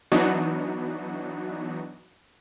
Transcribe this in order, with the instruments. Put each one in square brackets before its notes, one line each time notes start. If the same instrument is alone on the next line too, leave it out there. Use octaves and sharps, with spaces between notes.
[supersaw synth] E3 F#3 B3 D4 D#4 F#4